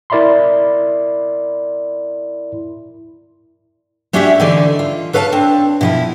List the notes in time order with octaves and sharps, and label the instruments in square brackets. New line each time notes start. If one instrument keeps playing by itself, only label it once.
[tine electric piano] E4 A#4 D5 E5 B5 C6
[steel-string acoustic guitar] A3 C#4 D4 F#4 G4 E5
D3 E3 D#4 A4 D5
F4
A4 B4 C#5 F5 F#5 A5
C4 D4
B2 F3 E4